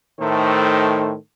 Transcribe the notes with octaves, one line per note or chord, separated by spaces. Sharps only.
A2 D#3 A3 D#4 C5